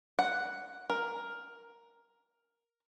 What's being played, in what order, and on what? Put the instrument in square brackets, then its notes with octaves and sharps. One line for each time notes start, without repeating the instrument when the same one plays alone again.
[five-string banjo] F#5
A#4